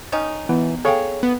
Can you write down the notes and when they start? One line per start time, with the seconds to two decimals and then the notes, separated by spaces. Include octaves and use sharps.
0.12 D#3 C#4 D#4
0.49 E3 B3
0.85 G#4 A4 C#5 F5 G5
1.23 B3